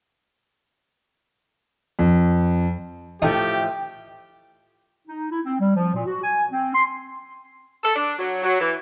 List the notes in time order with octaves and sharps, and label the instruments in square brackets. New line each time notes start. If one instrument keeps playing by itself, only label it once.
[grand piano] F2
[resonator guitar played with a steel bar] A2 F3 A3 [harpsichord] D#4 [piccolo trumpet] G4 [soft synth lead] G5
[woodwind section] D#4
E4
C4
G3
F3
A#2
F#4
G#5
C4
C6
[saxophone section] A4
D4
F#3
F#3
E3